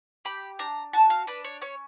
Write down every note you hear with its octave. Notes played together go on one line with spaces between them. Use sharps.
G4 B5
D4 A#5
F#4 A5
F5
D4 B4
C#5
C#4 C#5